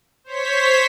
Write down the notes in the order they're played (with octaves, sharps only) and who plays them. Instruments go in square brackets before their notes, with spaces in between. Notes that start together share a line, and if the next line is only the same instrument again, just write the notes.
[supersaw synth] C5 C#5 B6